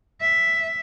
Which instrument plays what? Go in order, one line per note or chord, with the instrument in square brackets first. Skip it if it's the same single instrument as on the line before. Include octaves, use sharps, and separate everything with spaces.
[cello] E5